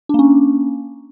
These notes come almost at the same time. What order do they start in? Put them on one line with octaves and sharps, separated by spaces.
D4 A#3 C#4